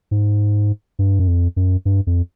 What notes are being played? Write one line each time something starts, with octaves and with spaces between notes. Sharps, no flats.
G#2
G2
F#2
F2
F#2
G2
F2